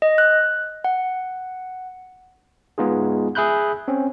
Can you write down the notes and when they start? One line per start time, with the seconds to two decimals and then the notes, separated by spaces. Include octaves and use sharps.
0.02 D#5
0.18 F#6
0.84 F#5
2.78 G#3 B3 D#4 F4 G#4
3.35 G#4 E5 B5 F#6 G6
3.88 C4 C#4